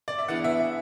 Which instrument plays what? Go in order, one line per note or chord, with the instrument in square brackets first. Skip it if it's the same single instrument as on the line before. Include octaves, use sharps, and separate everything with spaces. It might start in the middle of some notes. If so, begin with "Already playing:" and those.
[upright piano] D5
E5
[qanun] E3 B3 D4 G#4 [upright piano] F#5
[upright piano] E5
E5